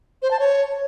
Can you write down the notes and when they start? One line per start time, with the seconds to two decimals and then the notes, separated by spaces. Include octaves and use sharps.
0.22 C5
0.31 A5
0.39 C#5